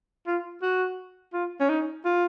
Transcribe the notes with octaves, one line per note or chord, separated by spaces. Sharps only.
F4
F#4
F4
C#4
D#4
F4